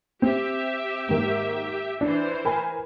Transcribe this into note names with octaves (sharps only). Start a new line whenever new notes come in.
C4 G4 E5
G#2 D#3 A#3
E3 D4 C5
A#4 G#5 B5